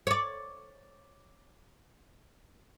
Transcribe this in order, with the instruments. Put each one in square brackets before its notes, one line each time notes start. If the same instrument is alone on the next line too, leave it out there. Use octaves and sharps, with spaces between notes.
[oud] C#5 D5